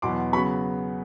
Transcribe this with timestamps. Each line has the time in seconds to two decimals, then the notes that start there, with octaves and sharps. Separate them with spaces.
0.02 E2 B2 F#3 B3 C6 D6
0.32 C#3 F#3 B3 B5 C#6